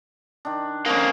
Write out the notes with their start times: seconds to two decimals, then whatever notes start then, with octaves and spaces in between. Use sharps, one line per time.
0.45 D#3 D4
0.86 A#3 C4 C#4 D#4